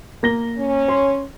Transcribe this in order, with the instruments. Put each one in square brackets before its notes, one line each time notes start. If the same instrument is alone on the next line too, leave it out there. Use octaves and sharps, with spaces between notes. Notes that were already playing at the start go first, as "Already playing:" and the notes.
[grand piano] A#3 A#6 G7
[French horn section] C#4
[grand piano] C#5 C6